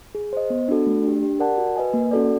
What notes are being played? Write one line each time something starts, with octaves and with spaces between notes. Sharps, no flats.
G#4
C5 D#5
B3
D4 F#4 A4
A3
D4 G4
G4
A#4 D5 F#5 A5
F#4
B4 D#5 G#5
A#3
C#4 F#4 A4 D5